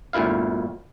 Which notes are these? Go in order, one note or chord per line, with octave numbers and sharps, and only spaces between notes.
G1 D2 A#2 E4 F5